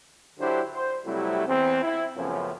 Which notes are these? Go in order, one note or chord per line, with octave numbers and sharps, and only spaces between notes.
D3 F#3 D4 E4 G4 C5
C5
C3 F#3 G3 A3 C4 E4
E2 C4
E4
F#2 A2 C#3 F3 B3 C#4